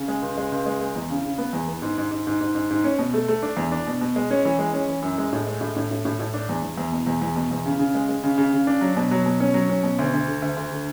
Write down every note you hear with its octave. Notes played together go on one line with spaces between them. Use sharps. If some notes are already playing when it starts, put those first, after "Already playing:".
Already playing: C#3
G#3
C#2
G#3
C#2
G#3
G#3
E2
C#3
C#3
B3
E2
B3
G#2
G#2
G#2
G#2
G#2
G#2
G#2
C#4
B2
A3
A3
D4
E2
D4
B2
B2
G#3
C#4
E3
G#3
C#4
E3
F#2
G#3
A2
G#3
A2
A2
A2
A2
A2
D4
E2
E2
E2
B2
E2
E2
B2
E2
C#3
C#3
G#3
G#3
C#3
C#3
C#3
D4
F#3
B2
F#3
B2
C#4
F#3
C#4
B2
D2
D2
D3
D2
D2
D3